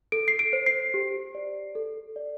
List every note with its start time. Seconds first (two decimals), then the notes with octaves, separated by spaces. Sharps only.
0.12 A4 D7
0.28 C7
0.39 D7
0.53 C5
0.66 C7
0.94 G4
1.35 D5
1.75 A4
2.16 D5